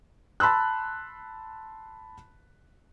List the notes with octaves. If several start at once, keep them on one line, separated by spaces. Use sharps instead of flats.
A5 B5 C6 E6 F#6